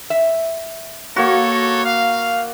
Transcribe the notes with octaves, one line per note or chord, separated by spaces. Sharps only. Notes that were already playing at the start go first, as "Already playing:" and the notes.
E5
A#3 F#4 A4 C#5
F5